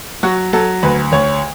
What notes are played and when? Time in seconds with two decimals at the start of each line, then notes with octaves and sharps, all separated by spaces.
0.23 F#3 F#4
0.53 F#3 A4
0.83 D2 B4
1.12 D2 C#5